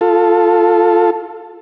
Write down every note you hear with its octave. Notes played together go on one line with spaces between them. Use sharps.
F4 A4